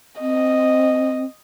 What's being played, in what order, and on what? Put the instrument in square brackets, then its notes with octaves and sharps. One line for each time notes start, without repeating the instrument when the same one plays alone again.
[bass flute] C4 [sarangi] D#5